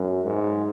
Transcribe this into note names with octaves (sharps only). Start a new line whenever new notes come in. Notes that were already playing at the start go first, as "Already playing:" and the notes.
Already playing: F#2
G#2